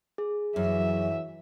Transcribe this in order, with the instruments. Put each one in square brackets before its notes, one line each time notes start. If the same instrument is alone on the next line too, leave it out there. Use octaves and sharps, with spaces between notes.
[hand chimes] G#4
[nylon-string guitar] F#2 [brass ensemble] E3 F#3 [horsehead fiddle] E5